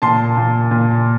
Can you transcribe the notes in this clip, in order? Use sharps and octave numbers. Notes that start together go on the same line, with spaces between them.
A#2 A5 C6
A#2
A#2